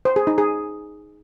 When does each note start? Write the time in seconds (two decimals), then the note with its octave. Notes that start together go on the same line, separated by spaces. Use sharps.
0.05 C5
0.16 G#4
0.27 D#4
0.38 G#4